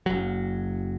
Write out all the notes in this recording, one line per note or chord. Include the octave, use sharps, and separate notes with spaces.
F#1 F#3